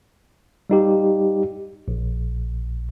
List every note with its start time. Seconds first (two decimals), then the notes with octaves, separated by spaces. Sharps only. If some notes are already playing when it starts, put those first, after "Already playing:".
0.70 G3 D#4 G4
1.88 A#1